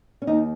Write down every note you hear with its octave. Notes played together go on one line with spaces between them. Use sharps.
C#4
D#2 D#4